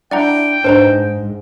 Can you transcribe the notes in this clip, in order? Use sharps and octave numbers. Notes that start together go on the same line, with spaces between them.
D4 E4 D5 F#5 G5 A5 A#5
G#2 D4 B4 C5 D#5 A#5